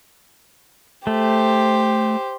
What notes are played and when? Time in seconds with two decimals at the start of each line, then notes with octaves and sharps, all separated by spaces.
1.07 A3 G4 C5